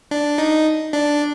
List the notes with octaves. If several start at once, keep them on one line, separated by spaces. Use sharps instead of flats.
D4
D#4
D4